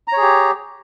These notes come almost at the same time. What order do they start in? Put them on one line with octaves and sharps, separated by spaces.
A#5 C#5 G#4 G4